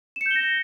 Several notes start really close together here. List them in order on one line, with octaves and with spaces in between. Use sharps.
E7 C#7 G6 G7 A#6